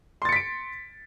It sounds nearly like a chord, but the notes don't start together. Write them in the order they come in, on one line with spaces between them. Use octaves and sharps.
C6 A6 C#7 B6 D7